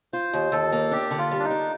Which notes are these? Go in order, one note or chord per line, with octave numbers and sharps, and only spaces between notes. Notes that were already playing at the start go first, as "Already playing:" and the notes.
F4 C5
D#2
D#2 A4
A#3
D4 G4
D3
F4
G3
D4
D#4
D4